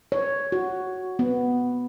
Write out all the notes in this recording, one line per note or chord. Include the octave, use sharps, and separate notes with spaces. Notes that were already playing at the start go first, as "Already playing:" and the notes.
C#5
F#4
B3